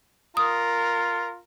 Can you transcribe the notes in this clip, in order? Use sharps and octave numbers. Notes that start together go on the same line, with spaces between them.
F4 A#4 D#6